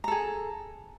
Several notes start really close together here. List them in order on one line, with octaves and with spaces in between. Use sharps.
A#5 A4 G#4